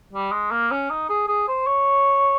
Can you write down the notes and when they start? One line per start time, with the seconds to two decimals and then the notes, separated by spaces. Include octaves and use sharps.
0.13 G3
0.32 G#3
0.51 A#3
0.71 C#4
0.90 D#4
1.10 G#4
1.28 G#4
1.48 C5
1.67 C#5